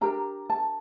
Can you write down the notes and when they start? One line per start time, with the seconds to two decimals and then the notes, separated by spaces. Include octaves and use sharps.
0.01 D4 G4 A#4 A#5
0.50 A5